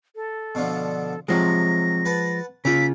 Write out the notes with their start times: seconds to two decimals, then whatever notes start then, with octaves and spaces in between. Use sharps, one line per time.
0.16 A4
0.55 B2 D3 F3
1.29 C3 F3 F#3 G#3 A#6
2.05 B4 F#5 A5
2.65 C#3 A#3 F4 E5 D6 B6